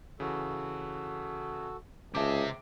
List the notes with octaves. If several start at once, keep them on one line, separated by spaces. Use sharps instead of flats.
C#3 E3 F#4 A4
C#2 C3 G#4 E5 A5 D6